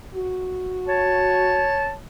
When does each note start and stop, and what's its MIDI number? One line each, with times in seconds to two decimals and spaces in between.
0.14 1.70 66
0.88 1.98 73
0.88 1.92 81